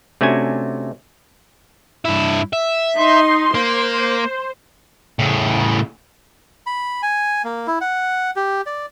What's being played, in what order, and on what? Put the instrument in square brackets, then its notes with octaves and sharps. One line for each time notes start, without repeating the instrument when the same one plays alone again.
[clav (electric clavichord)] C3 A3 C#4 D4 F#4 G#5
[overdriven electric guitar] G2 E4
E5
[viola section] D#4 C6
[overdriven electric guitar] A#3 [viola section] C5
[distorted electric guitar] A2 C#3
[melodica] B5
G#5
A#3
E4
F#5
G4
D5